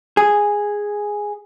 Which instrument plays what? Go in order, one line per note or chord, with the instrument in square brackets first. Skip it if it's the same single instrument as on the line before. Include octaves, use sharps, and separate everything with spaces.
[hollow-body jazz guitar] G#4